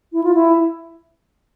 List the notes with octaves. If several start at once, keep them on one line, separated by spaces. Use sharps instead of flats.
E4
F4
E4